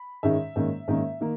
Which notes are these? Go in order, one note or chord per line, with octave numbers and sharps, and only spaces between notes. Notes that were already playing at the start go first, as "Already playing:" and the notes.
Already playing: B5
G#2 D#3 G#3 C#4 E5
G#2 D#3 A#3 C#4
G#2 D#3 A#3 C#4
D#3 A#3